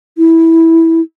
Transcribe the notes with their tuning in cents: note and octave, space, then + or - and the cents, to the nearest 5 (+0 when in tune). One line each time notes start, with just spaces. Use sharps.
E4 -10